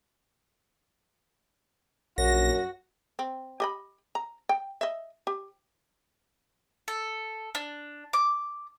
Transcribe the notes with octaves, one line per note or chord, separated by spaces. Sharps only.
A#1 F#2 F#4 A#6
C4
G4 D#5 B5
A#5
G5
D#5 E5
G4
A4
D4
D6